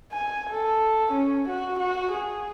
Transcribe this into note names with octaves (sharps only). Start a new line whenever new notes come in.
G#5
A4
C#4
F#4
F#4
G#4